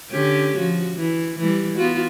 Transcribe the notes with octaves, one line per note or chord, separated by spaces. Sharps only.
D3 C#4 G4
F3 F#4
E3
E3 G3
B3 F4 F#4